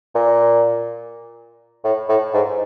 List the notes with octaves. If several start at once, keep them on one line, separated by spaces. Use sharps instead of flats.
A#2
A2
A2
G#2